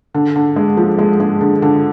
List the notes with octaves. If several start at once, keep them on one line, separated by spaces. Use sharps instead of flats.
D3
D3
G#3
F3
G#3
G#3
D3
D3